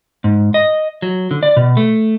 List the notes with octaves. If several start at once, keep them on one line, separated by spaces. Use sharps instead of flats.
G#2
D#5
F#3
D3
D5
B2
A3